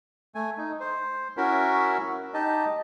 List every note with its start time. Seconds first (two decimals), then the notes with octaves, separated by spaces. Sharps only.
0.35 A3 G#5
0.58 D#4
0.80 C5
1.37 C#4 E4 F#4 A#4 E5
2.34 D#4 G4 D#5 A5